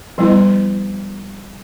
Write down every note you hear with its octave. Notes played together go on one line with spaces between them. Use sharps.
F3 G3 B3 E4